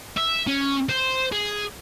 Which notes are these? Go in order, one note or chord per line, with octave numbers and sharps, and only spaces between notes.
E5
C#4
C5
G#4